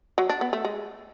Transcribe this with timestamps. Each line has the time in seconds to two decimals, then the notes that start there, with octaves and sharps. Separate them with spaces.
0.18 F#3
0.30 D4
0.41 B3
0.53 A3
0.65 G#3